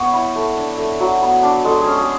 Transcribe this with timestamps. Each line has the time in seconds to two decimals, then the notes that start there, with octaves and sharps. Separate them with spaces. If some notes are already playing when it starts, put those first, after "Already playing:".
Already playing: B3 C#5
0.13 E4
0.36 A3
0.56 D4
0.78 A3
1.00 F#3
1.21 B3
1.43 D4
1.64 G#3 A4
1.81 C#4 G#4
1.97 G#4